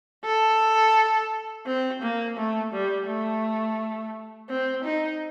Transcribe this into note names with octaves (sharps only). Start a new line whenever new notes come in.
A4
C4
A#3
A3
G3
A3
C4
D#4